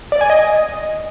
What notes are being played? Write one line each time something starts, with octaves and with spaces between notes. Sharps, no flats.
D5
G#5
D#5